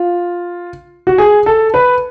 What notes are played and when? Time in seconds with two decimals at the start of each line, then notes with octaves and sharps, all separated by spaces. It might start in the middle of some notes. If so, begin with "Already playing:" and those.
Already playing: F4
1.07 F#4
1.18 G#4
1.46 A4
1.74 B4